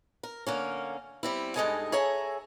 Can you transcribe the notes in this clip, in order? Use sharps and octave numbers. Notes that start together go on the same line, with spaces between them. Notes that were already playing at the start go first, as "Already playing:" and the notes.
A#4
D3 A#3 C#4
G3 C4 E4
G2 G#3 D#4 A4 D#5 G#5
G#4 A4 C#5 E5 G#5 A#5